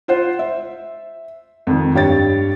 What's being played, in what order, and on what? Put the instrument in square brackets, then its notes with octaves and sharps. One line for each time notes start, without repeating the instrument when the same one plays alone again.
[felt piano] F4 C5 F#5
E5
F2 D#3
G2 G4 C#5 A6